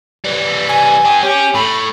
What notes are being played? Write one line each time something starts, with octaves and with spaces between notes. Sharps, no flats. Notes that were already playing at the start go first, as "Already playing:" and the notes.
E3 G3
G#5
D4 G4
C#4 G4
A2 B5